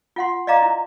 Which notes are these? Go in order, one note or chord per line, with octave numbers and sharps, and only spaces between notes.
F4 F#5 C6
D5 D#5 F5 A#5 D6
E4